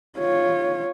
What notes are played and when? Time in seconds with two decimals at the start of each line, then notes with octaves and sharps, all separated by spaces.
0.19 F4 C#5